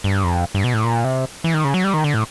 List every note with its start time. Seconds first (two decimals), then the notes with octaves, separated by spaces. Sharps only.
0.04 G2
0.24 F2
0.55 G2
0.64 B2
0.74 A2
0.84 A#2
1.04 C3
1.44 E3
1.54 D#3
1.64 C#3
1.74 F#3
1.84 G3
1.94 D#3
2.04 D3
2.14 A2